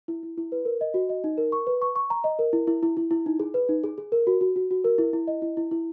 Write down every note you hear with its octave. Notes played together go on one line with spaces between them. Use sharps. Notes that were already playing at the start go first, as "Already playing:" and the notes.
E4
E4
E4
B4
A#4
D#5
F#4
D#5
D#4
A#4
C#6
B4
C#6
C#6
A#5
D#5
A#4
E4
E4
E4
E4
E4
D#4
G#4
B4
D#4
G#4
G#4
A#4
F#4
F#4
F#4
F#4
A#4
E4
E4
D#5
E4
E4
E4